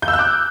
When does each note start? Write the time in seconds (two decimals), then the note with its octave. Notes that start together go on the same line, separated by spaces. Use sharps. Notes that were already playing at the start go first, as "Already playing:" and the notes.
0.02 G6
0.08 E6
0.13 F#6
0.19 D6